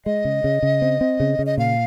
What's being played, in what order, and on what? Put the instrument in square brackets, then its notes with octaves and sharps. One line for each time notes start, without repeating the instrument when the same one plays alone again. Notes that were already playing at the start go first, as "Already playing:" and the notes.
[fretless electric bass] G#3 [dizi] D#5
[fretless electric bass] C#3
C#3
C#3
C4
C4
C#3
C#3
[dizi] D#5
[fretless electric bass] A#2 [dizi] F5